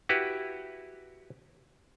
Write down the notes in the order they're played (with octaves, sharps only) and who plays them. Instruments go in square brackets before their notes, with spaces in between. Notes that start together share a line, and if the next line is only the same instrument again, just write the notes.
[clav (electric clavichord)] E4 F#4 G4 B4